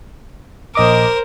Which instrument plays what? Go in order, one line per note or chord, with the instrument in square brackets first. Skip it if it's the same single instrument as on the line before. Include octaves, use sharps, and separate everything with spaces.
[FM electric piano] A#1 D#5 D6 [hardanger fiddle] A#4 C5